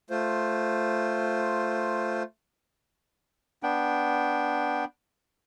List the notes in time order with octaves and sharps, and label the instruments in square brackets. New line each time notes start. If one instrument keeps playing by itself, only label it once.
[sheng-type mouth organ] A3 F4 C5
[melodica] B3 D4 G5